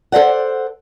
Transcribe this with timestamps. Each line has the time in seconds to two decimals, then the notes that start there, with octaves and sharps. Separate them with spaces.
0.12 A4 C5 D5 F#5